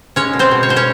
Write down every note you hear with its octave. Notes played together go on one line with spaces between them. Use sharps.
G#3 C#4 C#5
B2
C4 C5
B2
C#5
B2 C5
C#4 C#5